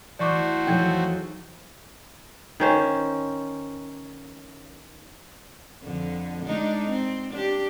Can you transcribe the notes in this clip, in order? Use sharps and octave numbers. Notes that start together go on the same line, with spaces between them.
E3 A3 F#4 C5 D5 C#6 D6
F2 F3 F#3 D#4 G#4 G5 G6 G#6
D#3 C#4 C5
F2 D3
G#3 D4 D#4
C4
D4 G4